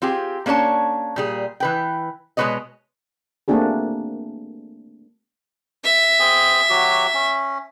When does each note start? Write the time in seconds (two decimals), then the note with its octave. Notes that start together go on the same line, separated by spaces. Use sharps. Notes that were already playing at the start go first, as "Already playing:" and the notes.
0.02 C4 F4 G4 G#4
0.46 A#3 C#4 D4 C#5 A5
1.16 A#2 G3 G#4
1.60 E3 B4 G5
2.37 B2 G#3 C4 B4 C#5 D#5
3.48 A3 A#3 C4 D4 F#4 G#4
5.84 E5
6.19 C4 G#4
6.70 F#3 F#4 G4
7.14 C#4